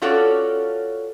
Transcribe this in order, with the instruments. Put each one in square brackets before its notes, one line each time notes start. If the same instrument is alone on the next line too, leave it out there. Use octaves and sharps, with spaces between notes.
[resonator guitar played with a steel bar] C#4 F4 F#4 A4 C#5 D5